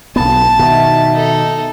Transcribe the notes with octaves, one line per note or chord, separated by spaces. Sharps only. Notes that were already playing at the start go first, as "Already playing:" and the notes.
B1 B3 A5
B2 D#3 E5
D#4 A4